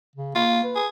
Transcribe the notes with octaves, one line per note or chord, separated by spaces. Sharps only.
C#3
A#3 F4
B4
G#4